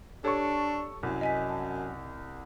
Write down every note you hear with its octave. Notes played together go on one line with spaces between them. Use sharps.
D4 G4 A4 C#5 C#6
C2 F#2
D#5 G#5 B6
A5